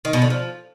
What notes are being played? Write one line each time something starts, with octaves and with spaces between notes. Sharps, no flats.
D#3
B2
D3
F3